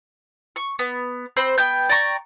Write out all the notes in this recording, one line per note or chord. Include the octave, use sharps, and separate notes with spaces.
C#6
B3
C4 C5 B5
B3 G5 G6
D5 G5 A#5 C#6